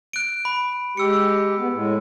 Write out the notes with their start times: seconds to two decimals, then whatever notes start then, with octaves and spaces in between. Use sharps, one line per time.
0.13 F#6 D7
0.45 B5
0.97 G#3 G4 E6 C#7
1.58 B3
1.73 A2 G#3